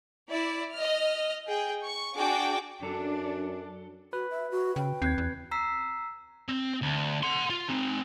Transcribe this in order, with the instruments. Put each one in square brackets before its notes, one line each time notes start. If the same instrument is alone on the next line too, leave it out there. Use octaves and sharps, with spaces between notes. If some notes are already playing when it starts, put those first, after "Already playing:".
[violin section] E4 D5
D#5 F6
G#4 G5
C#6
D4 F#4 G#4 G5 D6
[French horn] F#2 [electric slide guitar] F#3 A4 [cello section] D4
[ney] F#4 [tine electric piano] B4
[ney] E5
F#4
[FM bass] C#3 [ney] G5
[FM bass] D#2 [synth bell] C4 F#6 G#6
[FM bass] E2
[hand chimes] A#5 E6 B6 C7
[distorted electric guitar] C4
D2
F#5 C6
F4
C4 D#4